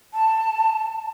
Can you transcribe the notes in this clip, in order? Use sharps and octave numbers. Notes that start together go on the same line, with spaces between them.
A5